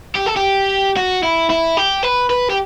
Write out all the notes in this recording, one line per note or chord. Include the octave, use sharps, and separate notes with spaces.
G4
A4
G4
F#4
E4
E4
G4
B4
B4
G4